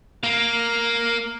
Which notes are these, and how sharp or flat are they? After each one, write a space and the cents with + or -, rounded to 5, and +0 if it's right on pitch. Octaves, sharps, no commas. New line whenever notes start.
A#3 +0 F5 +5